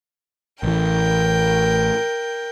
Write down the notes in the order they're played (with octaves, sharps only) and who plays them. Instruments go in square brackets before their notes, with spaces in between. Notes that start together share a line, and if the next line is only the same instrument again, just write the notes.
[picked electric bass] A1 E3 [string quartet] A#4 G5